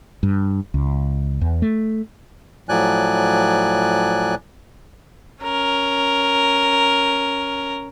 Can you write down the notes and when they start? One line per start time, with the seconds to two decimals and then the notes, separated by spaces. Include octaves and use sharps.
0.23 G2
0.74 C#2
1.41 E2
1.62 A3
2.69 A2 F3 F#3 D5 G#5 F#6
5.43 C#4 A#4